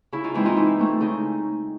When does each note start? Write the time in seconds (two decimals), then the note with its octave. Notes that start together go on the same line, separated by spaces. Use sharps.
0.12 C#3 E4
0.24 D#4 F4
0.34 E3 G#3 C4 E4
0.45 D#4 F4
0.56 E3 E4
0.79 A3 C4
1.01 C#3 D#4